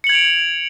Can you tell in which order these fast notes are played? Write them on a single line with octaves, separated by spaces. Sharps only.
C#7 F#7 G#6 F7 D7